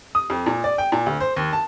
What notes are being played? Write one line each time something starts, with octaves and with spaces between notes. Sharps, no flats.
D#6
F2
A#2
D5
G5
A#2
D2
C5
D#2
A5